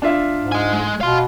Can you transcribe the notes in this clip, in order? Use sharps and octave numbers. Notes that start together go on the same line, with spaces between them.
D4 F4 E5
G#2
D#5 G#5
G#3
B2 F5 C6